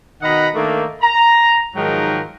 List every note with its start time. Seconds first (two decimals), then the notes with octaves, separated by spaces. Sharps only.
0.23 B2 D#3 D#5 F#5 A#5 B5
0.55 D#3 A3 A#3 D4 D#4
1.02 A#5
1.76 G#2 D#3 F3 F#3 A#4 G5